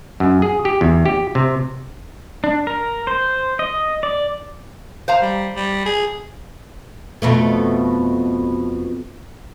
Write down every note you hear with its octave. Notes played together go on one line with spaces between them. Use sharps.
F#2
G#4
G4
E2
G4
C3
D4
A#4
C5
D#5
D5
C5 F5 A#5
G3
G3
G#4
F2 B2 A3